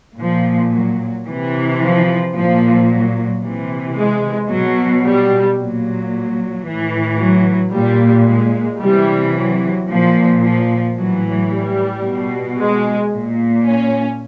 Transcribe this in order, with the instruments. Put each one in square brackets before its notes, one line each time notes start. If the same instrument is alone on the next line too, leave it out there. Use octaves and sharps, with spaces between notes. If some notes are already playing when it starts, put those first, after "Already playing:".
[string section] A#2 F3
F#3
C3 E3
F3
A#2 F3
F#3
C3 E3
G#3
B2 F#3
G3
A#2 F#3
A2 E3
F#3
A#2 G3
G#3
C3 E3 G3
F#3
A#2 F3
F3
A2 E3 F#3
G3
B2
G#3
A#2
C#4